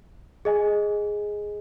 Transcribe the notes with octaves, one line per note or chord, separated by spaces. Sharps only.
G#4 D#5 G#5